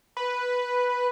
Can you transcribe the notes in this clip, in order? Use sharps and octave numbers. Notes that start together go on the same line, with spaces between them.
B4